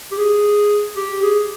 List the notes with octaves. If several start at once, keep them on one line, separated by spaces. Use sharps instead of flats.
G4
G#4
G4
G#4